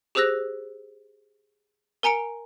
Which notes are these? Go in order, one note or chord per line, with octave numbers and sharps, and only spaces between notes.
G4 G#4 C5 E6 F#6 A#6
A#4 G#5 A#5 C#7 D7